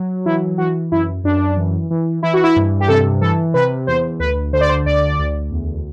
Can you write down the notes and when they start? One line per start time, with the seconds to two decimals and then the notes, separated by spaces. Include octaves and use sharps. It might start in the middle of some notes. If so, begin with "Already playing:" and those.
Already playing: F#3
0.26 E3 E4
0.58 E3 F#4
0.92 F#2 E4
1.24 F#2 D4
1.57 E3
1.91 E3
2.23 E3 E4
2.34 F#4
2.43 E4
2.56 G2
2.80 G4
2.88 C3 A4
3.21 E3 A4
3.54 C3 B4
3.87 E2 C5
4.20 D2 B4
4.53 D3 C5
4.61 D5
4.69 C5
4.86 D2 D5
5.19 D2
5.51 E2